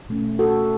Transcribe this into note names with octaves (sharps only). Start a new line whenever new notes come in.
B2 A3 C#4
F#4 A4